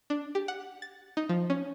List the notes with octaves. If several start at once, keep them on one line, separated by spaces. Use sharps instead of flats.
D4
G4
F#5
A6
D#4
F3
C#4